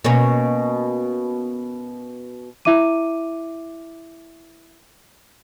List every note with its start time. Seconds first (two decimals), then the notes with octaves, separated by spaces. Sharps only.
0.04 B2 A#3 C#4
2.65 E4 E5 D6 D#7